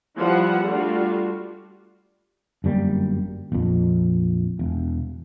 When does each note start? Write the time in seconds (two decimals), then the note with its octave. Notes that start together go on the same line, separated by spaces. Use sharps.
0.17 F3 G3 E4 B4 F#5
0.67 G3 A3 D4 F4 F#4
2.64 G1 F#2 G3 A#3
3.52 A#1 F2
4.59 E1